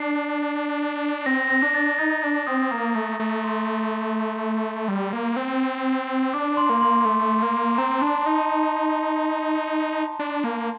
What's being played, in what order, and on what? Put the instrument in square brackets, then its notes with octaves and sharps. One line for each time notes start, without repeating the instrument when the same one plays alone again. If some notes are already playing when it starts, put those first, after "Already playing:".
Already playing: [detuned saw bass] D4 [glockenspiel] C7
[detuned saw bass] C4 [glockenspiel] A#6
[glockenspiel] A#6
[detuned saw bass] D4
[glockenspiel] A6
[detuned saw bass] D#4 [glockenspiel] A6
[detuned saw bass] D4
[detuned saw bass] C4 [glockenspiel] D#6
[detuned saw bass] A#3 [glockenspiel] A#5
[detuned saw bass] A3 [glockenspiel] A#5
[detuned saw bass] A3 [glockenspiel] A#5
[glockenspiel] C6
[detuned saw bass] G3
A#3
C4
[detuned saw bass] D4 [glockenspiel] D6
[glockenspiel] C6
[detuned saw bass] A#3
[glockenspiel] C6
[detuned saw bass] A3
A#3
[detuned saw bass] C4 [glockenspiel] A#5
[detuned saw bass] D4 [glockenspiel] A5
[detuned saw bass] D#4 [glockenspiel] A5
[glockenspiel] A#5
A5
[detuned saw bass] D4
A#3